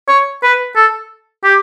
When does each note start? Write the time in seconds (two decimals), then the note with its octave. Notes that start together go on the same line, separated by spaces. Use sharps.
0.08 C#5
0.43 B4
0.76 A4
1.44 G4